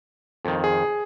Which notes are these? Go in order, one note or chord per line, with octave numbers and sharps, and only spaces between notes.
F2 D#3
G#4